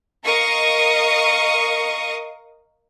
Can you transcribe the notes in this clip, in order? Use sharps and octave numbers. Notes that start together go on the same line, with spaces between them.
A#4 D#5 F5 C#6 D#6